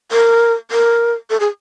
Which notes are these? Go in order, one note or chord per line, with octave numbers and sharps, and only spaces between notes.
A#4
A#4
A4
G#4